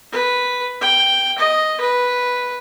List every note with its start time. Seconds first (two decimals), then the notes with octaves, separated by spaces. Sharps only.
0.12 B4
0.81 G5
1.38 D#5
1.80 B4